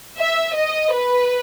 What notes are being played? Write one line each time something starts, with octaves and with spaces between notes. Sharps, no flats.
E5
D#5
B4